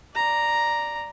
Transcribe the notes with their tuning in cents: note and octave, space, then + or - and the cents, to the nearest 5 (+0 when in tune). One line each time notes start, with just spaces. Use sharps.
D5 +0 A#5 +0